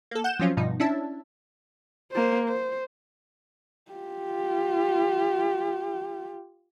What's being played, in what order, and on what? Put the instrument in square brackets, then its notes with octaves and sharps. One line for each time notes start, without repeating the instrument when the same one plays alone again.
[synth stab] A#3 A4
F#5 G6 E7
F3 F#3 C4 C#4 F4
G2 B2 F3 D#4
C#4 D4 E4 E5 A5
[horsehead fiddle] A#3 C5
C5
F4 G4